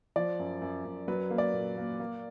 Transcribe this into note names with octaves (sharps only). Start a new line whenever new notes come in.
F3 D5
F#2
F#2
F#2
F#3 B4
A#3
D5
A#2
A#3
A#3